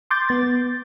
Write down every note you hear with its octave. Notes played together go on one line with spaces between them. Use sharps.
C6 D6 G6 A6
B3 A6